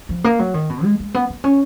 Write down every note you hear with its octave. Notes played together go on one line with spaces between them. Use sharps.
F3
A#3
F#3
D#3
B2
G#3
G#3
B3
B3
C#4